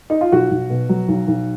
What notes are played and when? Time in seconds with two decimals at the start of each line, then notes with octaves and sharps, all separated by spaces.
0.10 D#4
0.21 F4
0.32 B1 F#4
0.51 B1
0.70 B2
0.89 F#3
1.08 B1
1.27 B1